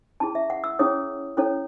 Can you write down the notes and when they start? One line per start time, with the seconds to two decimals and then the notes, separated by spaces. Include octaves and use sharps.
0.20 C#4 E4 G#4 A5
0.35 E5
0.50 F#5
0.64 E6
0.79 C#4 E4 G#4 C#5 D#6
1.37 C#4 E4 A4 C#5